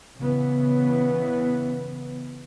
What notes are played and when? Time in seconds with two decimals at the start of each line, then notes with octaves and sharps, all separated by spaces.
0.19 C#3 E3 B3